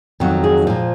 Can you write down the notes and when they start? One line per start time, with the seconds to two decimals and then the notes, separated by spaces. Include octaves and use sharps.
0.20 F2 D#3 F#3 F#4
0.44 G#4
0.67 A#2 F3